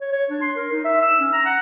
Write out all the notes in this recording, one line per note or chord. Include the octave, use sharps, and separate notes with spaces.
C#5
C#5
D4
C6
A#4
D#4
E5
E6
C#4
A#5
F#5